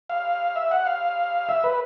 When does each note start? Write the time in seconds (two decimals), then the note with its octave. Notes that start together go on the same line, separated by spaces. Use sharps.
0.10 F5
0.56 E5
0.71 F#5
0.87 F5
1.49 E5
1.64 B4